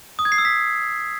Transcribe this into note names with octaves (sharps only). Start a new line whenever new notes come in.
D#6
G#6
C7
E6
B6